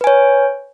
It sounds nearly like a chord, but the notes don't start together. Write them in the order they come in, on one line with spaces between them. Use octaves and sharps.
B4 G#5 C#5